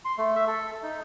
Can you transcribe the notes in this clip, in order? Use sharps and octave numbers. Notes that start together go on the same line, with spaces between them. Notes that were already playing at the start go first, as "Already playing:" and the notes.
C6
A3
E5
A4
D#4